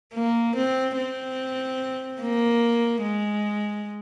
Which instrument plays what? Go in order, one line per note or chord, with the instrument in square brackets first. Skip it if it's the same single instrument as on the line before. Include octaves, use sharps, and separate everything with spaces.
[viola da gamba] A#3
C4
C4
A#3
G#3